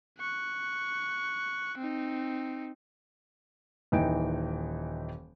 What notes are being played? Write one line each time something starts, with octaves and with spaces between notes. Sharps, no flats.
C#6 F#6
C4 D#4
D#1 E3 D#4 G5 D7